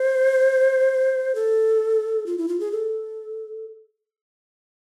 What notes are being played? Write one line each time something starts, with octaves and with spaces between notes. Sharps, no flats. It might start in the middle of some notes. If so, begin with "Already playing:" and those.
Already playing: C5
A4
F4
E4
F4
G#4
A4